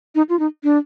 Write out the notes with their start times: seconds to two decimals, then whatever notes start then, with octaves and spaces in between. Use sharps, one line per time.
0.15 D#4
0.29 F4
0.39 D#4
0.64 D4